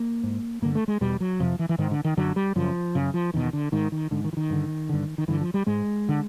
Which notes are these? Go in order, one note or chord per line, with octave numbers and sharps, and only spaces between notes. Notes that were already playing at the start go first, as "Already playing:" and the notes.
Already playing: A#3
G#2
G2 D3 A#3
A3
G#3
E2 B2 G3
F#3
F2 C3 F3
E3
E3
G#2 D#3
D3
D#3
F#2 D3 F#3
G3
F#2 C#3 F3
F#2 C#3
F3
E2 B2 D#3
D3
G#2 D#3
D#3
G#2 D3
D#3
E3
D#3
G2 D3
G2 D3
D#3
G2 D3 E3
F3
G3
G#2 G#3
D3